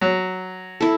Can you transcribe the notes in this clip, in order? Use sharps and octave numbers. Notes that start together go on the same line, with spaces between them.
F#3
E4 A4